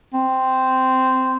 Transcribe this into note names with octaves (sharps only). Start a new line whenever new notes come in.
C4